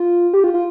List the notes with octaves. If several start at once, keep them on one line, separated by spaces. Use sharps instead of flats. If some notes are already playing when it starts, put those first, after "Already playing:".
Already playing: F4
G4
F4
F4